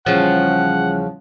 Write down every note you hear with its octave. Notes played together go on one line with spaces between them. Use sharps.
E2 C#3 F3 G3 C#4 F4 F#5